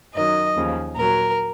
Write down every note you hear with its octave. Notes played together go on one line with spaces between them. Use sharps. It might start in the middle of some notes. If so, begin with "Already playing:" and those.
F#2 D#3 F#3 D#5
D#2 C#3 F3
A#2 F#3 A#4